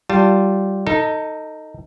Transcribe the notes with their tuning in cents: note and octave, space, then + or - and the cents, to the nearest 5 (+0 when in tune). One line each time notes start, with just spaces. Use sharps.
G3 -15 F4 +0 A5 +20
D#4 +0 A4 +30